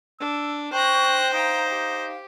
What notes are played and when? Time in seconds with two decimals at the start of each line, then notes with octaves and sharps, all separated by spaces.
0.20 D4 E6
0.73 C5 G5 C#6 F#6 A#6
1.33 D#4 F5 G5 A#5
1.68 G4